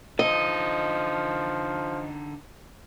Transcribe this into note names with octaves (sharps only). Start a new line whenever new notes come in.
D3 F3 D#4 D#5